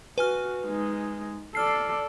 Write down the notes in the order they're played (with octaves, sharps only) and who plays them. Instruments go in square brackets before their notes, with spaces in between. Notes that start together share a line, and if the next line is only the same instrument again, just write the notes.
[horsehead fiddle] F#4 [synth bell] B4 G#5 F6
[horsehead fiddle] G#3 D#4
[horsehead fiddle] A4 D5 [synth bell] F6 C7